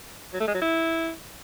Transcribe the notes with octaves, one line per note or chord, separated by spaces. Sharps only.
F#3
A3
G#3
F#3
E4